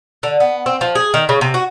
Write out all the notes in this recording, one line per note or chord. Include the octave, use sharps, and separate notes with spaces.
D3
B3
C4
F3
G#4
D#3
C#3
C3
F#4